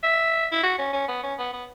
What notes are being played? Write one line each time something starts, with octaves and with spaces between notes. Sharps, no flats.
E5
E4
F#4
C#4
C#4
B3
C#4
B3
B3